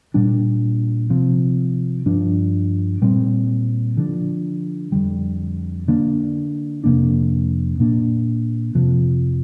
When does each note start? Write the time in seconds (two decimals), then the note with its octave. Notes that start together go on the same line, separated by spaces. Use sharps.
0.14 A#2 G3 D4
1.10 C3 F3 C4
2.06 G2 F3 D4
3.02 A#2 G3 C4
3.97 D3 F3 D4
4.92 F2 D3 G3
5.88 D3 A#3 D4
6.84 F2 C3 A#3 D4
7.79 A#2 A#3 D4
8.75 F2 C3 F3